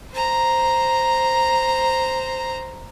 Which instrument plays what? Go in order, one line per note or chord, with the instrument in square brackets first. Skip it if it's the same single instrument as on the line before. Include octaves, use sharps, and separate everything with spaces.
[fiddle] C5 A#5